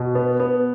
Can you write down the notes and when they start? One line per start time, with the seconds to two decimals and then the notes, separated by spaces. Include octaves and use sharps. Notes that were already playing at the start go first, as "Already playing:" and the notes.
Already playing: B2
0.15 B3
0.40 B3